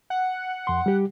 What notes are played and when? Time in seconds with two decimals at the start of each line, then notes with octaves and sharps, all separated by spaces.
0.10 F#5
0.67 F2 C6
0.86 G3 G4